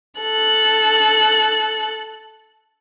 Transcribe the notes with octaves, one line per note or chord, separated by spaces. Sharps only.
A4 F#6